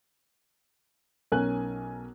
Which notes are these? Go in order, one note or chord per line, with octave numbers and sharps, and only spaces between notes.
B1 C#4 A#4 G#5 F#6